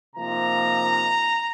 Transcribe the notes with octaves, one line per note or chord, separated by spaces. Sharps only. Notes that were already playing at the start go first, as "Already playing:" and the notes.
C3 F3 A#3 D#4 A#5